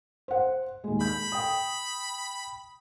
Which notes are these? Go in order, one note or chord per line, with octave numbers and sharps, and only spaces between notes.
C5 F#5
D#2 G#3
B5 G6
G5 D#6